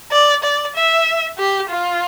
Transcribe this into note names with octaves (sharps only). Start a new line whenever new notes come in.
D5
D5
E5
G4
F4